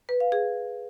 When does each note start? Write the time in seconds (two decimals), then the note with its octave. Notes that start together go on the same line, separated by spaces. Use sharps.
0.09 B4
0.20 F5
0.32 G#4